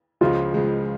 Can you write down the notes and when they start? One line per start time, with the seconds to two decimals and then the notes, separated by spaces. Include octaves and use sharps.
0.21 C#2 C#3 F3 G#3 F4
0.54 C#2 C#3 F3 G#3